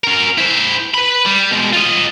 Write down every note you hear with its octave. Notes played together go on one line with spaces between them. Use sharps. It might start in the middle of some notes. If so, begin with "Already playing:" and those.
C#4 A#4
E4 C5
B4 B5
G3
B2 G#3
F4 D#5